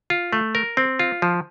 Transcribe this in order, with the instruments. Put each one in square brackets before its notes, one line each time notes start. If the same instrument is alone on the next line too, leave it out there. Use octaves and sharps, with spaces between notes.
[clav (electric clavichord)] F4
A3
A#4
C4
F4
F3